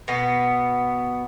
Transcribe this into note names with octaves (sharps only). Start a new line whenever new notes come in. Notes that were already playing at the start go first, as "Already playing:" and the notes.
B2 B3